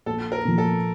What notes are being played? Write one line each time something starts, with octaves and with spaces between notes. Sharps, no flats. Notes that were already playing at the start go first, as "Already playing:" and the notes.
A#1 A4
A#4
A#2 F3
A4